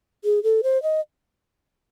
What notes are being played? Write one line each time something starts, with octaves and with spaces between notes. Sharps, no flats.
G#4
A4
C5
D#5